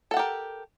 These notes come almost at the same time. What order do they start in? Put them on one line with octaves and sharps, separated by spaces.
A4 F#5 G4 A#4